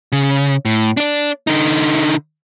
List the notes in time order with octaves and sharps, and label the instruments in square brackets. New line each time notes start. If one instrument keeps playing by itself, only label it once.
[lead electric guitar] C#3
A2
D4 D5
D3 D#4